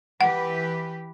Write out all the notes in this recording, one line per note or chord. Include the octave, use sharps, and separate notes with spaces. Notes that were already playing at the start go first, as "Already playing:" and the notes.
E3 G4 B4 F#5